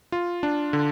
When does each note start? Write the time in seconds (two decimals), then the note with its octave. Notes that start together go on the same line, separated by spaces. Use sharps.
0.12 F4
0.43 D4
0.73 D3